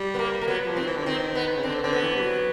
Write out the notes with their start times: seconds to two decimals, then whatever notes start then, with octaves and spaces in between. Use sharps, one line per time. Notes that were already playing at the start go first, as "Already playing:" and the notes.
Already playing: G3
0.14 B3
0.19 A#3
0.41 A#3
0.48 F#3 B3
0.61 F#3
0.67 F3
0.76 C4
0.81 D#3
0.86 E3
0.97 D3
1.06 D#3 C4
1.35 B3
1.56 C#3
1.63 D3 C4
1.83 D3 C4
1.93 B3
2.03 E3
2.16 G3
2.22 F#3